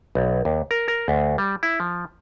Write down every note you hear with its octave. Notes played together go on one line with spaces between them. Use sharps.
B1
D#2
A#4
A#4
D2
G3
E4
F3